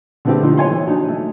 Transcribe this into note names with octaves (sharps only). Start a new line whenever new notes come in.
D3 G3 A3 B3 C4 G4
D3 F3 D#4 F4
C#5 G#5 C6
E3
F#3 D4 D#4
A3